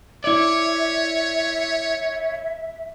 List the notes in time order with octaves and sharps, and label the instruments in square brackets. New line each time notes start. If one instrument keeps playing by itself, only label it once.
[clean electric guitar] E4 D5 [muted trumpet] C#5 [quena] E5